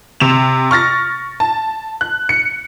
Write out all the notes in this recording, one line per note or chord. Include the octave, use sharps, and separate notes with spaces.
C3 E7 F7
C#6 F6 A6 A#6
A5
F#6
C#7